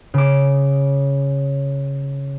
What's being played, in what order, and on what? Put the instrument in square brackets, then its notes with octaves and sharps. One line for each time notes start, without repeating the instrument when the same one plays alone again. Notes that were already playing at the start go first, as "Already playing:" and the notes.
[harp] C#3 D6